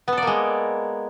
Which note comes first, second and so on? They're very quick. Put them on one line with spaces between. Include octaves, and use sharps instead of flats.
B3 A4 D5 A#3 G#3